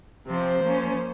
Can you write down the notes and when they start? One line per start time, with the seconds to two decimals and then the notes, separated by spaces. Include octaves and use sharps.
0.27 C3 F3 C4 C5
0.62 F3 A#3 C#4